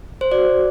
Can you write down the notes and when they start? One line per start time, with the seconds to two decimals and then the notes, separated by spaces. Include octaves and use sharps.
0.21 C5
0.32 F#4 D5